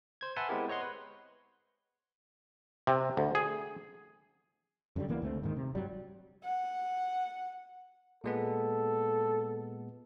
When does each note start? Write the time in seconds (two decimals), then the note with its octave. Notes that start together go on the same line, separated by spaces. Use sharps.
0.21 C5 G#6
0.36 B4 E5 F#5 G#5 A5 C6
0.48 G#3 B3 C4 E4 G4 A#4
0.68 C5 C#5 D#5 F#5 C6
0.80 B4
2.87 C3
3.17 D2
3.35 G#4
4.96 F#2 D3 F3 G3
5.08 C#2 E3 A#3 B3
5.22 C#2 D3 A3 C4
5.42 D#2 G#2 D3 D#3
5.57 C3
5.75 G2 F#3 G3
6.44 F#5
8.24 A#2 G#3 B3 A4